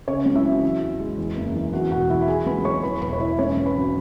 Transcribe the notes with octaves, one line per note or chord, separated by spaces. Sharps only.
C#3 C#4 C#5
C#2
E4 E5
F#3
E3
E2
G#3
E2
F#1
E3
E2 F#4 F#5
E1 F#4 F#5
E3 E4 E5
B5
B2 G#4 G#5
C#2 B4 B5
F#3 C#5 C#6
E2 B4 B5
E1 B4 B5
C#5
E3 E4 E5
G#2 C#4 C#5
G#1
B4 B5
F#3